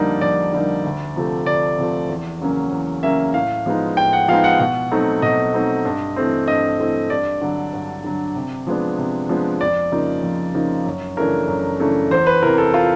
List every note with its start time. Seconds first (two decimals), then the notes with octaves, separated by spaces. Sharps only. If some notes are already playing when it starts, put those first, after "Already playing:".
Already playing: F2 D3 G3 A#3 D#4 D5
0.21 F2 D5
0.53 D3 G3 A#3 D#4
0.84 D2
1.16 C3 F3 A3
1.46 D2 D5
1.78 C3 F3 A3
2.09 E2
2.41 C#3 F#3 A#3 C#4
2.72 E2
3.03 C#3 F#3 A#3 C#4 E5
3.34 A2 F5
3.66 F3 G#3 B3 D#4
3.97 A2 G5
4.13 F#5
4.28 F3 G#3 B3 D#4 F5
4.44 F#5
4.59 B2 F#5
4.91 F#3 A3 C4 D#4
5.22 B2 D#5
5.54 F#3 A3 C4 D#4
5.85 G2
6.16 E3 A3 C4
6.48 G2 D#5
6.79 E3 A3 C4
7.10 G2 D5
7.41 D3 F#3
7.73 G2
8.04 D3 F#3
8.35 C3
8.67 F3 G#3 B3 D4
8.98 C3
9.29 F3 G#3 B3 D4
9.61 F2 D5
9.92 C#3 F3 A#3 D#4
10.23 F2
10.54 C#3 F3 A#3 D#4
10.86 F#2
11.17 C#3 E3 A3 D4 A#4
11.48 F#2
11.80 C#3 E3 A3 D4
12.11 E2 C5
12.27 B4
12.42 C3 E3 A#4
12.58 A4
12.74 F4